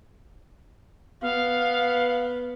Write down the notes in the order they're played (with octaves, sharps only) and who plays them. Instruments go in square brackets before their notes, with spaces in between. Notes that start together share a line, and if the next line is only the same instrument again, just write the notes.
[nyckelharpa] B3 [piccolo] F5